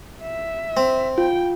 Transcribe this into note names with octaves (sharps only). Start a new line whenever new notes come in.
E5
C4
F4 G5